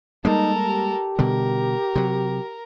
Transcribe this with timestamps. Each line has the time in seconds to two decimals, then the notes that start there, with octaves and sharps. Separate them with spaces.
0.25 G3 G#3 A#3 D#4 A4 A#4
0.64 G4
1.19 B2 D3 G3 A#4
1.95 C3 F#3